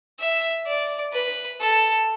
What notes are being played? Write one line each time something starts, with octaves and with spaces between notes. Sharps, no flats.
E5
D5
B4
A4